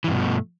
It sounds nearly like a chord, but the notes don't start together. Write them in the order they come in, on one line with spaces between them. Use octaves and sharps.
E3 G2 B2 F3 A3